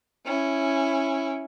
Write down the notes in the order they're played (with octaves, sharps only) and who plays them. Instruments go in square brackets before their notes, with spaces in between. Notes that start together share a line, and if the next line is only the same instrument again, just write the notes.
[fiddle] C#4 E4